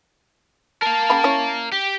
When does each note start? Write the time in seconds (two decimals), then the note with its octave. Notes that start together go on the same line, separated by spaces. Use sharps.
0.82 A#4 F5 A5
1.10 C#3 G5 B5
1.24 C#4 E4 C#5
1.73 G4